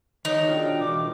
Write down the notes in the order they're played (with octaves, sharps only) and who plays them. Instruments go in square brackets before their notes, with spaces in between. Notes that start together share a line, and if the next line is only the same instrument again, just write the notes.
[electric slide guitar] D#3 C#5 [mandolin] D#4
[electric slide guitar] D4 G#4 [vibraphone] F4 F#4 [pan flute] G5
[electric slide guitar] B2 E3 [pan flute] D6